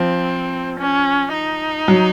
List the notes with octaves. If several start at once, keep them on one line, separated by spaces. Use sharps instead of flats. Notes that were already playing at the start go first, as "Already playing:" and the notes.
Already playing: F3 C4
C#4
D#4
F#3